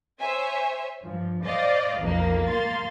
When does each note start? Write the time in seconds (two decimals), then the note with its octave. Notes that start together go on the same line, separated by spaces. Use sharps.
0.19 C5 C#5 E5 G#5
1.04 G2 F3
1.45 C5 D5 D#5 F5
2.00 B1 F2 A#3
2.50 A#3 F5 C6 A6